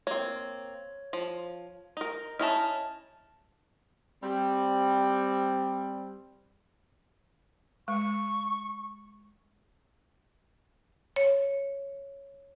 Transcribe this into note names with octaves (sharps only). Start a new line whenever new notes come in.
A#3 C4 C#5
F3
D#4 A#4
C#4 D#4 E4 A5 F6
G3 C4
G#3 C#6
C#5